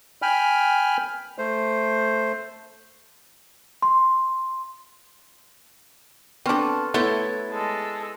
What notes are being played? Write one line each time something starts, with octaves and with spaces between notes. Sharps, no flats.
G5 G#5 B5 F6
A3 C5
C6
B3 C4 D4 A4 C6 C#6 F6
A3 B3 E4 C#5 C6 A6
G#3 A4